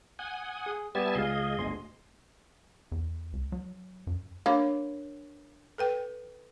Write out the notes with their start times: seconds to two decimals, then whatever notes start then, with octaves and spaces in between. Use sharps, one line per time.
0.19 F#5 G#5 D#6
0.66 G#4
0.95 G3 B3 G4 E5 G#5 A5
1.15 C#2 G#4 D#5 F5
1.58 G1 D2 C6
2.92 E2
3.33 C#2
3.52 F#3
4.07 F#2
4.46 A#3 D4 C#5
5.78 A4 B4 G5